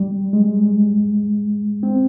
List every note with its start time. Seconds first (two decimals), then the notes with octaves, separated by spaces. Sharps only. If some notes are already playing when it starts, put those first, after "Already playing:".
Already playing: G3
0.33 G#3
1.83 C4